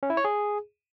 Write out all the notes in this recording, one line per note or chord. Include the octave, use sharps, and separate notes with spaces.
C#4
E4
C#5
G#4